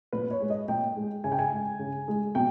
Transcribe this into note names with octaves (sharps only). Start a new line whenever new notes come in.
A#2 B4
C#5
G#3
D#5
A#2 G5
G#3
C#3 G#5
G5
G#5
G#3
C#3
G#3
B2 G5